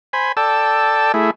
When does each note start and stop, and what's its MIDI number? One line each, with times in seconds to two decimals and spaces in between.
0.13 0.32 72
0.13 0.32 80
0.13 0.32 83
0.37 1.12 69
0.37 1.12 74
0.37 1.12 79
0.37 1.12 81
0.37 1.12 88
1.14 1.31 57
1.14 1.31 64
1.14 1.31 68